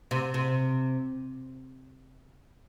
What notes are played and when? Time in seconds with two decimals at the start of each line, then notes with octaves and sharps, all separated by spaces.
0.11 C3
0.34 C3